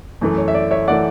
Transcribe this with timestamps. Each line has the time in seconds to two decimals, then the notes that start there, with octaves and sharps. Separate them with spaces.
0.21 F#2 E3 A3
0.38 C#5
0.48 E5
0.54 D5
0.71 C#5 E5
0.88 D5 F#5
0.90 E3 A3